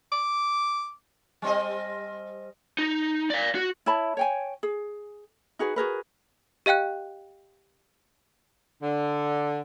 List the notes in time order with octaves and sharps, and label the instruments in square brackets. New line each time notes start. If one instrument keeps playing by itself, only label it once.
[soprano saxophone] D6
[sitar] G3 C4 D#5
[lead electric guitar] D#4
D5 F5
F#4
[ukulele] E4 C#5 A5 B5
C#5 G5 G#5
G#4
D#4 F#4 G#4 B4
F#4 G#4 A#4 B4
[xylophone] G4 D#5 F5 G5 F#6
[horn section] D3